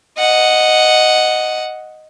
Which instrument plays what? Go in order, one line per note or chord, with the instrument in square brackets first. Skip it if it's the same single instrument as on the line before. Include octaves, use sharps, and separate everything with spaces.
[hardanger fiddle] D#5 F#5